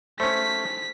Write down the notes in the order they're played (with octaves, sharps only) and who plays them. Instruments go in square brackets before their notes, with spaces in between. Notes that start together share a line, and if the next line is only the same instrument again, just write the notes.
[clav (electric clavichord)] A3 C#4 [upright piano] C5 [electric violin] B6